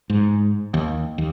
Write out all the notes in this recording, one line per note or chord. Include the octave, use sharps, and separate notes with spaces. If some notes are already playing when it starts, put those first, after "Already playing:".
G#2
D#2
D#2